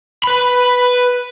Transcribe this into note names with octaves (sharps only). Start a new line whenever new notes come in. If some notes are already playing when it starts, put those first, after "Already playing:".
B4 B5